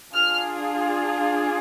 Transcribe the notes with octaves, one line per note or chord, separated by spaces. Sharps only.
D4 F4 G#4 F6